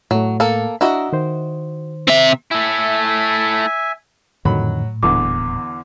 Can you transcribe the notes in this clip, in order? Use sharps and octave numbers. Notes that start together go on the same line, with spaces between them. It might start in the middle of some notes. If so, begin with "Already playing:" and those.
A2 F#3 A3
A#3 A4
D4 E4 F#4 D#5 A#5 E6
D#3 C5
C3 E5
A3 E4 E5 G#5
F2 A2 D3 D#3 F#3 B5
D#1 E2 D3 E3 D6